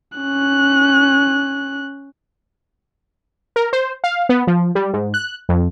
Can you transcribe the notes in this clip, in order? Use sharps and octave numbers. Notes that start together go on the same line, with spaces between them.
C#4 F#6
A#4
C5
F5
B3
F3
G3
G#2
F#6
F2